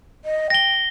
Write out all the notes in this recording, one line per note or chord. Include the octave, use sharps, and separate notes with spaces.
D#5
G5 A#6 G7